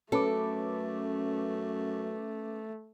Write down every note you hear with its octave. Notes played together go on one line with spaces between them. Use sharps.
F#2 A3 C#4 A4 B4 D6